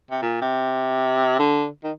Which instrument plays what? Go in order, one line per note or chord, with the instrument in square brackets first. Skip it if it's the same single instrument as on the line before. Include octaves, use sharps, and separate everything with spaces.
[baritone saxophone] C3
A#2
C3
D3
D#3